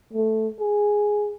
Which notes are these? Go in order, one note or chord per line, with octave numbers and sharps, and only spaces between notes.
A3
G#4